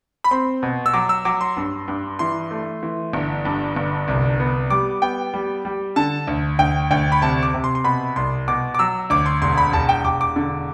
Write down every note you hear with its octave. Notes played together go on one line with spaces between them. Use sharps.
B5
C4 C6
B2
E6
F#3 D6
E6
F#3 D6
C6
G2
G2
E3 C6
A3
E3
G1
G2
G1
C2
B3
G3 D6
B3 G5
G3
G3
D3 A5
D2
D2 G5
D2 G5
B5
C3 A5
D6
C3
C6
C6
B2 B5
C2 C6
B2 D6
D6
F#3 E6
D2 D6
C6
E1 C6
B5
E1 A5
G5
E1 D6
D6
D3